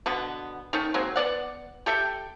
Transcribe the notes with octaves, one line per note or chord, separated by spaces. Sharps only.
B2 D3 B3
D#3 A3 C#4
F#3 G#3 A#3 C4
B3 D4 D5 F#5
G4 A4 E5 G5